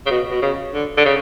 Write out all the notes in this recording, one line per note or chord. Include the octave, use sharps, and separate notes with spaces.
C#3
B2
B2
C#3
D3
D3
C#3